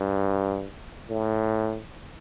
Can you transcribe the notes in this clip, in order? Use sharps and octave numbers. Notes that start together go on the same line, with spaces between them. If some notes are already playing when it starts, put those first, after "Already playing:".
Already playing: G2
A2